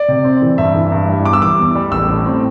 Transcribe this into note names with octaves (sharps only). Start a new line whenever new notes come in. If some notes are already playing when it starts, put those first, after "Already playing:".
Already playing: D5
C3
C4
E3
G2 E5
E3
G2
G3
E2 D6
E6
E3 D6
E2
G3
A1 E6
A2
C4